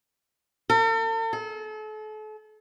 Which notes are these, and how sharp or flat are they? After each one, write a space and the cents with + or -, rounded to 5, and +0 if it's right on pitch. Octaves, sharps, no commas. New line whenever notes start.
A4 +45
A4 -40